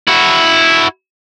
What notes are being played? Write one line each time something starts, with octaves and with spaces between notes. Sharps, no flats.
E4 F#4